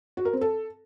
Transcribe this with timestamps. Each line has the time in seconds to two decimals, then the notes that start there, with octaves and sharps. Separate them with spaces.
0.17 F#4
0.25 A#4
0.33 C4
0.41 A4